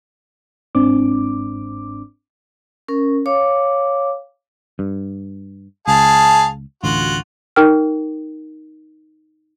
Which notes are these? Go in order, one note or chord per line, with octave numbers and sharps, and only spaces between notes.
G1 G#2 C4 D4 D6
C#4 A#4
C#5 F5 D6
G2
C#2 G#4 F5 A5
A1 D2 F4 F#4
D#4 A#4 G5 F6